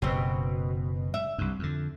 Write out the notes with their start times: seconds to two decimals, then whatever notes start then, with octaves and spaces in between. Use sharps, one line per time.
0.02 F#1 F#2 B2 C4
1.14 E5
1.38 C2 G2
1.59 F2 D3